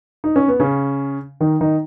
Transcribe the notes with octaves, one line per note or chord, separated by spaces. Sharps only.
D#4
C#4
B3
C#3 C#4
D#3 D#4
D#3 D#4